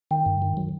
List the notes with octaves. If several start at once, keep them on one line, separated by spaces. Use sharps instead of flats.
D#3 G5
G2
D#3
F#3